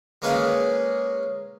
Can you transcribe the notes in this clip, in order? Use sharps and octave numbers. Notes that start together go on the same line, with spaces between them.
G#3 A#3 C#4 G#4 B4 F5